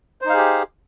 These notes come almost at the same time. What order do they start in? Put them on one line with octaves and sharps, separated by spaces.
C5 D#4 F5 G#4 G4